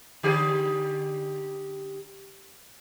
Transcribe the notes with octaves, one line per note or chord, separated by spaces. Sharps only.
D3 G4 G#4